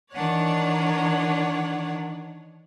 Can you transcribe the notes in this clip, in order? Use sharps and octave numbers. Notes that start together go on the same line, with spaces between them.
D#3 E3 D4 C#5 D5 F#5